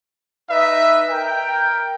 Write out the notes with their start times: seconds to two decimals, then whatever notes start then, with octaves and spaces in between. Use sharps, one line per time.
0.50 D#4 B4 D#5 E5
1.10 A#4 G5